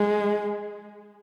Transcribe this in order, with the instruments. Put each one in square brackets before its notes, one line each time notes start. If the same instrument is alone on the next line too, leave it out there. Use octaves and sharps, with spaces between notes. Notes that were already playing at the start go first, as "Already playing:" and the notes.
Already playing: [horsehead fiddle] G#3